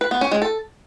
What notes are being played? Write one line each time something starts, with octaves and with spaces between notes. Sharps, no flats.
B4
B3
C#4
G#3
A4